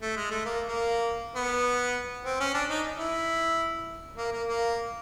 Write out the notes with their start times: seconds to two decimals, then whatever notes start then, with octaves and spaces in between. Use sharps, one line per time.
0.02 A3
0.17 G#3
0.31 A3
0.45 A#3
0.68 A#3
1.35 B3
2.25 C4
2.40 C#4
2.54 D4
2.70 D#4
2.99 E4
4.18 A#3
4.33 A#3
4.48 A#3